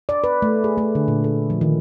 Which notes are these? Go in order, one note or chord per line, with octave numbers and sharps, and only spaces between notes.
D5
B4
A3
G#4
A3
D3
A#2
A4
F3
D#3